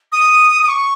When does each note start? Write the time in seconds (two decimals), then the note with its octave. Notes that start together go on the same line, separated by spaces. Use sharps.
0.12 D#6
0.63 D#6
0.69 C#6